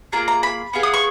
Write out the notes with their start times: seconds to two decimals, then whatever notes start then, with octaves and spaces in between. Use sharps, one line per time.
0.12 A#3 F4 G#4 A#5
0.28 A#5
0.43 B5
0.73 B3 F4 G#4
0.83 D#6
0.94 C#6